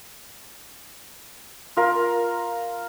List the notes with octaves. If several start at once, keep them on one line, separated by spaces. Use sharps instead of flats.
F4 A#4